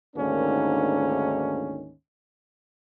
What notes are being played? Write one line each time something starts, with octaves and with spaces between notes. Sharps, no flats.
D2 G#2 D#3 A#3 C#4 D4